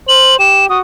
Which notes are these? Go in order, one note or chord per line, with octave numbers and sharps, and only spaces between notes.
C5 F#7
G4 E7
F#4 D#6